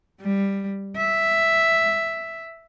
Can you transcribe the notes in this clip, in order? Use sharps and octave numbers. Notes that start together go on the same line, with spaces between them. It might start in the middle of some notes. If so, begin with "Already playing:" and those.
G3
E5